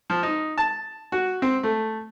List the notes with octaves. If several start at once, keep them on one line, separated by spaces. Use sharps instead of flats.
F3
D#4
A5
F#4
C4
A3